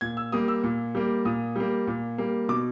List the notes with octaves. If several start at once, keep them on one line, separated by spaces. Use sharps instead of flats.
A#2 G#6
E6
G3 A#3 D#6
E6
A#2
G3 A#3
A#2 D#6
G3 A#3
A#2
G3 A#3
B2 D6